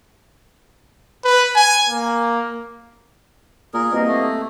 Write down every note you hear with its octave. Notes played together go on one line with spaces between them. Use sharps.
B4
G#5
A#3
A#2 G#4 A#4
C2 B2 A#3 D#5
A3